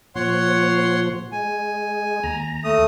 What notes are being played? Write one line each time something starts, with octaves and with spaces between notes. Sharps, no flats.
A#2 F3 C#5 F#5 C6
G#3 G#5
D#2 A#5
A3 D#6